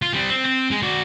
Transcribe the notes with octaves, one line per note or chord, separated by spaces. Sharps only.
F4
G3 C4
C4
C4
G#3
F#4 D5